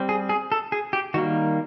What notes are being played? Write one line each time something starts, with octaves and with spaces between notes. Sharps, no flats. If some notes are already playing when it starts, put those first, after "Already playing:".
Already playing: G3 C4
G#4
G#4
A4
G#4
G4
D#3 G3 A#3 F#4